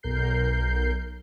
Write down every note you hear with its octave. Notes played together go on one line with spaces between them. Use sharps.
B1 A#4 G6 C7